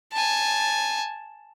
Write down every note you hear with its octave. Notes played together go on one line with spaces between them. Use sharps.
G#5 A5